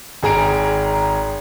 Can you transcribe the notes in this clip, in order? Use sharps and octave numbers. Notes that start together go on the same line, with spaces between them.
G#1 G#4 A#5 D7